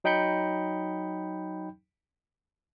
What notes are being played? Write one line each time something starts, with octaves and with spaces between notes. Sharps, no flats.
F#3 D#4 G5 B5 G6 C#7